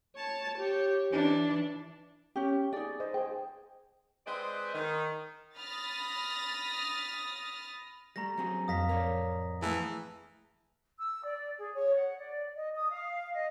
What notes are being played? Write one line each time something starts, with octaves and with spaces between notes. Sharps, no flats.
C#5 A5
G4 C#5
E3 D4
C#4 G4
D#4 G#4 D5
C5 D#5
G#4 C5 G5
G#3 C4 B4 C5 D5 D#5
D#3
B5 D#6 F6 A6 A#6
G3 A3 A#5 A#6
F#3 C4 G#4
F2 A2 F5 D#6 A#6 B6
A#4 C#5 D5
E3 A3 G#4 A5
E6
D5
G#4
C#5
F#5
D5
D#5
D#6
F5
D#5